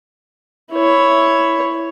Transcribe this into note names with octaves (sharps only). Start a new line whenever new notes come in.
E4 C#5